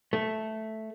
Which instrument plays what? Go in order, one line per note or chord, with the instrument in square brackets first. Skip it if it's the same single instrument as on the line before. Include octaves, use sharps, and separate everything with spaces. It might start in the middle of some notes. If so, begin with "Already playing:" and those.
[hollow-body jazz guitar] A3